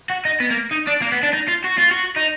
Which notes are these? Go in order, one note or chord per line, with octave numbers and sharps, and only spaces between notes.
F#4
D#4
B3
A#3
D#4
D4
A#3
B3
D4
D#4
F4
F#4
F4
F#4
D#4